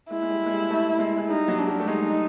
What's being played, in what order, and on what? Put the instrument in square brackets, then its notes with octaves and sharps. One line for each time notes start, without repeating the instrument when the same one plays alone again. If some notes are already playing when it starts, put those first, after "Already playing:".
[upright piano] G#3 [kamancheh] E4
[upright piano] G#3
G3
G#3
G3
A3
G#3
G#3
[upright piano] G3 [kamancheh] D#4
[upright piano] F#3
[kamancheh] D4
[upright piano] G3
A3
[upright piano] G#3 [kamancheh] D#4